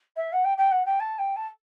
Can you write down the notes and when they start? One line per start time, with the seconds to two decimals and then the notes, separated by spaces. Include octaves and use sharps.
0.16 E5
0.33 F#5
0.44 G5
0.58 G5
0.71 F#5
0.86 G5
1.00 A5
1.19 G5
1.36 A5